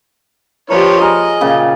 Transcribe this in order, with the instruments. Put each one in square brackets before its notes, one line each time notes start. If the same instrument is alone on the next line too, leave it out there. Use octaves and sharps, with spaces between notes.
[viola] F3 G4 [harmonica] D4 B4 C#5 [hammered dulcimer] A#4
[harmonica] G#4 [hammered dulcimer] A#4 [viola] D#5
[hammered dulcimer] A#2 C#3 G4